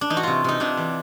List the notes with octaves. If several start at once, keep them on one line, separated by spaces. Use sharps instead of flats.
D4
E3 D#4
F#4
C3 F4
C3 D#4
C3 D4
E3